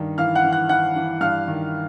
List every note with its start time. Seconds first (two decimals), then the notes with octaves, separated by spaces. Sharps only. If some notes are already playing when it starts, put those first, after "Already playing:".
Already playing: G2 D#3
0.18 E3 F5 F6
0.35 F#5 F#6
0.44 E3
0.52 F#5 F#6
0.69 E3 F#5 F#6
0.96 E3
1.21 G2 F5 F6
1.48 D#3